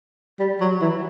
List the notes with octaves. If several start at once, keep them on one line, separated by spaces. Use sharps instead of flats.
G3
F#3
E3